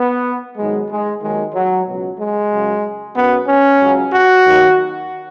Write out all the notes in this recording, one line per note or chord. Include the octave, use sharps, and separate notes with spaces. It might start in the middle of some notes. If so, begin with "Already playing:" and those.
Already playing: B3
G#2 D#3 F#3 G#3
G#3
D#2 D#3 F#3 G#3
F#3
C#2 B2 F#3
G#3
F#2 C#3 F#3
F#2 F#3 B3
C#4
C#2 C#3 F#3
F#4
D#2 D#3 F#3